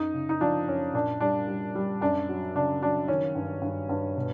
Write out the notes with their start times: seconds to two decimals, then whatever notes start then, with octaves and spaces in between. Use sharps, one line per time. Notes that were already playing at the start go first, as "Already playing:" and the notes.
Already playing: F#2 D#4
0.14 C#3
0.29 D#4
0.41 F3 D4
0.68 F#2 C#4
0.94 A#2 D4
1.20 G3 D4
1.47 G3
1.75 G3
2.01 F#2 D4
2.29 F#3
2.55 C#3 D4
2.82 F#3 D4
3.08 D#3 C#4
3.35 G2
3.62 G2
3.89 G2
4.16 B2